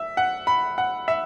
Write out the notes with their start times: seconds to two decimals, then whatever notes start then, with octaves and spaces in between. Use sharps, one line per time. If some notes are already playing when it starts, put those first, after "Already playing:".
Already playing: E5
0.17 F#5
0.47 B5
0.78 F#5
1.08 E5